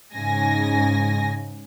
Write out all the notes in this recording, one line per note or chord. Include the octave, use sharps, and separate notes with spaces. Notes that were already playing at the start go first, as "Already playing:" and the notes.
G#2 C#3 G#5 A#6